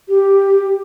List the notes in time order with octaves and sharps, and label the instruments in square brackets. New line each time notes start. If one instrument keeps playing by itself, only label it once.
[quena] G4